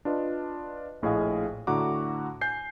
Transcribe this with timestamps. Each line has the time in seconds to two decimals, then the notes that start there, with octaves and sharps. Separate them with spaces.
0.05 D4 F4 B4 D#5
1.02 A#1 A2 G#4 D#5 F5 G#5
1.67 A2 D3 F#4 F#5 A#5 D6
2.41 G#5 G6 C7